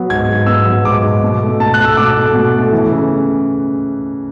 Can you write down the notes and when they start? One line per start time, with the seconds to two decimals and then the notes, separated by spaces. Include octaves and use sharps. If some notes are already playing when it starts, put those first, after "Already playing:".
Already playing: F#3 B3
0.10 G#2 G#6
0.28 G#2
0.46 B3 E6
0.65 F#3
0.84 G#2 D6
1.03 G#2
1.23 B2
1.41 A3
1.59 B2 A5
1.74 A3 F#6
1.85 E6
1.97 B2 D6
2.16 A3
2.34 B2
2.54 A3
2.72 E3
2.91 C#3